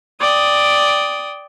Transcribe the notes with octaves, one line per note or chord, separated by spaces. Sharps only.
D5 G5 D#6